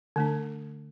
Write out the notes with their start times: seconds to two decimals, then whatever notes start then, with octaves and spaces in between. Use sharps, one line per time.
0.16 D3 A3 D4